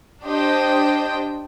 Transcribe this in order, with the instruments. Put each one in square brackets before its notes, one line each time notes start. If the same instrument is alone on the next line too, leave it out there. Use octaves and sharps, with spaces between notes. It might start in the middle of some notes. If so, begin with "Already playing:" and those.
[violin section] D4 G4 C5 D#5 G5